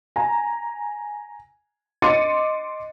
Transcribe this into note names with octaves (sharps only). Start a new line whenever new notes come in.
G#5 A#5
D#5 C6 D6 A6 C#7 D#7